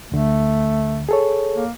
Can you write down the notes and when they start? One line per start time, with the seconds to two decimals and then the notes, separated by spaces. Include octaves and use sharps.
0.12 D2 D3 A3
1.09 G#4 A4 C#5
1.55 A#3